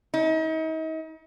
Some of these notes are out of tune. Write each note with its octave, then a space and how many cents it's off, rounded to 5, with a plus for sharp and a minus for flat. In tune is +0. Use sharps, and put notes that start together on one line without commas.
D#4 +40